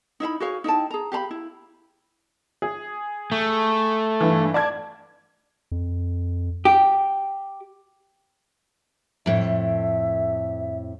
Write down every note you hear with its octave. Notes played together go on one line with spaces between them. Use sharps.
D#4 E4 E5 B5
F#4 G#4 C#5 F5
D#4 E4 G5 A5
G#4 A#5
G4 F5 A#5 B5
E4
G#4
A3
G2 E3
D5 A5 G#6
F2
G4
F2 A2 E5